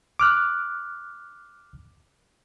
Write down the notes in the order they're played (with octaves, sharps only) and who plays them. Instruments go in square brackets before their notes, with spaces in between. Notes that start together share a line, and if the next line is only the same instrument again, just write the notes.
[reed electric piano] D6 F6 F#6